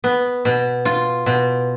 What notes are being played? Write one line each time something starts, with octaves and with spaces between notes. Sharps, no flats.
B3
B2
F4
B2